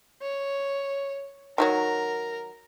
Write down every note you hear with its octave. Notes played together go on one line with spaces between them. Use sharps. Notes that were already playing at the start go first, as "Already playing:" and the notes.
C#5
D#3 F3 F#3 A#4